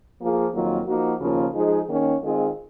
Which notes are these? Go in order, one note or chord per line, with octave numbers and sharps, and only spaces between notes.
F3 A#3 F4 G#4
F2 D#3 F#3 A#3 F4
F3 A#3 D#4 F#4
D#2 C#3 F3 A#3 F4
F3 G#3 D#4 G#4
D#3 A#3 C#4
D#3 G#3 C4 F4 G#4